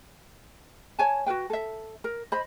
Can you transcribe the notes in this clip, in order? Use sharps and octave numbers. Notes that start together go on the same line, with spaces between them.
C#5 G#5 A5
F#4 A#4 B4 G5
A4 E5
A#4
C5 D#5 B5